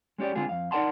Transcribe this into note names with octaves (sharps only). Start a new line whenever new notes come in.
G#3 C#4 G4 D5
D3 G#3 C4 F4 G#4
F2 F5
D#4 A#4 D5 F#5 A5 C6